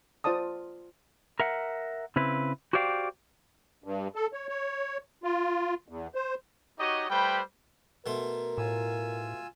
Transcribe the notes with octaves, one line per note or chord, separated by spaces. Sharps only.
F4 C5 D5 A5 D#6
A#4 E5 F#5
C#3 C4 E4 B4
F#4 G4 C5 D5 F5 G5
G2
A4
C#5
C#5
F4
E2
C5
D#4 F#4 G4 C#5 D#5
G3 A3 B4 C5 G5 B5
B2 A3 A#4 C6
A2 F4 G#5 E6